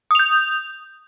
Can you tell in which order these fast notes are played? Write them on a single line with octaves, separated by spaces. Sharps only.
D#6 F7 G6